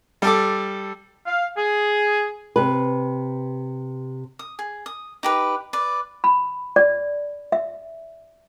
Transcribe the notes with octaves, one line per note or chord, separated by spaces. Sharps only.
G3 A4 D6
F5
G#4
C3 B4
D#6
G#4
D#6
D#4 G4 B4
B4 D5
B5
D5
E5